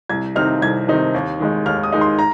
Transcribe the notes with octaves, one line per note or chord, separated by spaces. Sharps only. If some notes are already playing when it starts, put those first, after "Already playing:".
C2 G#6
C3 D#3 C4 D#4 F6
C2 G#6
C3 D#3 C4 D#4
D#2
D#3 G#3 D#4
D#2 F6
D#6
D#3 G#3 D#4
C6
A#5